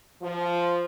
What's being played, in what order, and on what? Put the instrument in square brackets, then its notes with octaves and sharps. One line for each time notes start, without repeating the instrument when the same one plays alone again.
[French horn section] F3